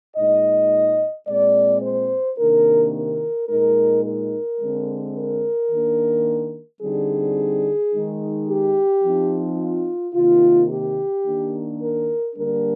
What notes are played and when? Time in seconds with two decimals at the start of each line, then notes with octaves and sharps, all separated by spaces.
0.16 A#2 G#3 D#4 D#5
1.27 A#2 G#3 C4 D5
1.82 C5
2.38 C3 D#3 A#3 D4 A#4
2.94 A#4
3.48 A#2 G#3 D#4 A#4
4.05 A#4
4.60 D3 G#3 C4
5.16 A#4
5.70 D#3 A#3 D4
6.81 D3 G3 C4 D#4 G#4
7.92 D#3 G#3 D#4
8.48 G4
9.03 F3 C4 D#4
9.59 F4
10.14 C3 D#3 A#3 F4
10.70 G4
11.24 D#3 A#3 D4
11.81 A#4
12.36 D3 G3 A#3 D4 A#4